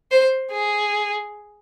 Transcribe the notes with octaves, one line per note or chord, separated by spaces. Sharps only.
C5
G#4